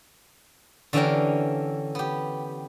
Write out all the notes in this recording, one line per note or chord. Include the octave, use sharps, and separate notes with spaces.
D3 E3 C#4 D4 G4 A#4
B3 G4